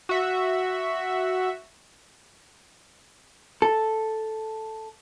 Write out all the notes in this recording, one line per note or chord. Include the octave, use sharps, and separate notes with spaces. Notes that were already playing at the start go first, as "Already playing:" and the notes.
F#4 E5
A4